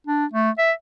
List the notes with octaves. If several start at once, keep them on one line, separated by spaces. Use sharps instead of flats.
D4
A3
E5